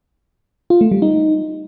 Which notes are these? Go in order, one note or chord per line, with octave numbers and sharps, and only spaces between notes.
F4
A3
G3
D#4